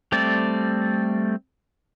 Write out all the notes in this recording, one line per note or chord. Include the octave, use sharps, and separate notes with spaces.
G3 A3 C4 D5